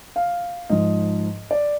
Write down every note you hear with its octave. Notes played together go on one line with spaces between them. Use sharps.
F5
G#2 F3 D#5
D5